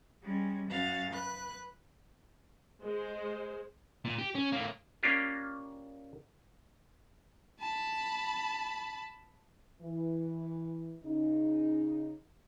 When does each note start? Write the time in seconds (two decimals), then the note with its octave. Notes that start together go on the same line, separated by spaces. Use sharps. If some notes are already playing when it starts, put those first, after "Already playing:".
0.23 G3 G#3 C#4
0.68 F#2 C#4 F#4 F5 A6
1.10 B4 F#6
2.82 G#3 C5
4.05 A#2
4.18 G4
4.35 C#4
4.52 A2 A#3
5.03 A#3 C#4 D4 F4 G4
7.60 A5 B5
9.81 E3
11.04 C#3 D#4